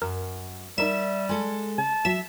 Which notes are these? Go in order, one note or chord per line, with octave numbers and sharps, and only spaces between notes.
F#2 A#4
G3 D#4 A#4 E5 E7
G#3 A4
C#3 A5
F#3 E5 B6 E7